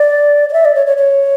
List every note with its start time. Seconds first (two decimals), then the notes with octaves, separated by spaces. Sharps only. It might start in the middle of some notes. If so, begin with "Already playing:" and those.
Already playing: D5
0.49 D5
0.53 E5
0.65 D5
0.75 C#5
0.87 C#5
0.97 C#5